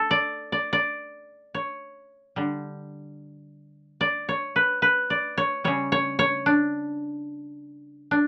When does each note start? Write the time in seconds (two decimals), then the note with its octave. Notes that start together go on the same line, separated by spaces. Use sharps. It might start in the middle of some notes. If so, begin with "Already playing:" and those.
Already playing: A4
0.11 D5
0.52 D5
0.73 D5
1.55 C#5
2.36 D3 G3
4.01 D5
4.29 C#5
4.56 B4
4.82 B4
5.10 D5
5.37 C#5
5.64 C#3 G3 C#5
5.92 C#5
6.19 C#5
6.46 D4
8.11 D4